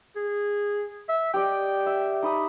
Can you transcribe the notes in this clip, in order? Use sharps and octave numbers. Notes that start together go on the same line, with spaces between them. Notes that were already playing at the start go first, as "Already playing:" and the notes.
G#4
E5
G4 D5 D#5 G5
E5
D#4 B5 D#6